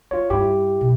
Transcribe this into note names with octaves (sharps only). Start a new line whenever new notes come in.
A#3 F4 C#5
G2 E4 G4
B2 A3